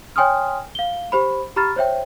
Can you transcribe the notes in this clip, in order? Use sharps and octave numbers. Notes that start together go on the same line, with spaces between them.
C#5 G5 G#5 C6 D#6 F6
F5 G7
G4 C5 B5
G4 A#5 B5 F6 A6
C5 C#5 E5 G5